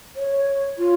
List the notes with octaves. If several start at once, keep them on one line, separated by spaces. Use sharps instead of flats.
C#5
F4